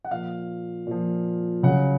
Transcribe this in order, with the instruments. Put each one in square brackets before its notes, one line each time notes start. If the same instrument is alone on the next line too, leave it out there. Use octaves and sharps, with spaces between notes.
[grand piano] F#5
A#2 F3 F5
A#2 F3
C#3 F#3 F#5